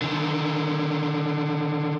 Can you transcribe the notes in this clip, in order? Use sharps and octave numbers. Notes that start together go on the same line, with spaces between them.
D3 D#3